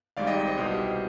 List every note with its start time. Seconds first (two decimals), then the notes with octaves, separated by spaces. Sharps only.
0.17 G#1 G#2 G3 D5 F5
0.27 D#5 G5
0.47 C5 D#5
0.58 C2 B2 G3